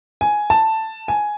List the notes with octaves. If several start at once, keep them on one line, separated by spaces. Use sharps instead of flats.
G#5
A5
G#5